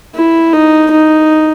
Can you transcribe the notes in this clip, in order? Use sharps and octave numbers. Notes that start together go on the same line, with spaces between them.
E4
D#4
D#4